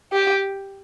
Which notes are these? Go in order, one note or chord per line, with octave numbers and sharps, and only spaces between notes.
G4